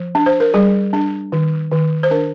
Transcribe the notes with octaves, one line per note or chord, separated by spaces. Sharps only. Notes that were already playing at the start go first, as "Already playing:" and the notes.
Already playing: F3
D4
C5
A#4
G3 G#4
D4
D#3
D#3
C5
D4 A#4